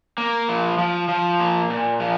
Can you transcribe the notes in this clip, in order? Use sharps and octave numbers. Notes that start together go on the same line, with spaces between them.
A#3
F3
F3
F3
A#3
A#2
F3